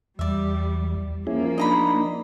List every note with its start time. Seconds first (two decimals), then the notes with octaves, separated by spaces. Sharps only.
0.19 E2 G3 D5 E5
1.27 F3 A#3 C#4 E4 G#4
1.58 D4 D#4 D#5 A#5 B5